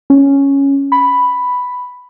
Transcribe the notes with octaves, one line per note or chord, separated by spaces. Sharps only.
C#4
B5